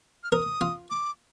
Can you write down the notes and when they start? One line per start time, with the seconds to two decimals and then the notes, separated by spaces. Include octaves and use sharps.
0.24 F6
0.32 A#4 D#6
0.61 F4
0.90 D6